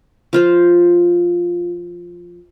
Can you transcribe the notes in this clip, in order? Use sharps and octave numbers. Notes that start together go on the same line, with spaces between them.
F3 F4 C5